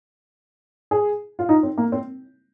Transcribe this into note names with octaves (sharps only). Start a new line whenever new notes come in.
G#4
F4
D#4
C4
A#3
C4